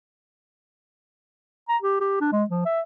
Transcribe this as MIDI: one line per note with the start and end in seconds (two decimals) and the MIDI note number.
1.69 1.77 82
1.82 2.00 67
2.00 2.16 67
2.21 2.29 62
2.32 2.44 56
2.50 2.63 53
2.65 2.81 76